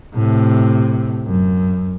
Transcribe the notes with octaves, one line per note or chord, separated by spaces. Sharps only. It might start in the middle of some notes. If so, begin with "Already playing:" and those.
A2 C3
F#2